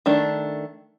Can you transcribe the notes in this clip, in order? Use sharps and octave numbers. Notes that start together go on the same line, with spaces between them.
D#3 A3 D4